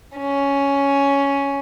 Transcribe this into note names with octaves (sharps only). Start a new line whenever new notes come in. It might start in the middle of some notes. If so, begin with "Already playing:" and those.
C#4